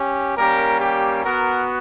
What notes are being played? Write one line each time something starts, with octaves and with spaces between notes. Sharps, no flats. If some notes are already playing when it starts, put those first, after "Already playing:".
Already playing: C#4 G4
G3 A#3 C#4 G4 A#4
G4
B3 F#4 A#4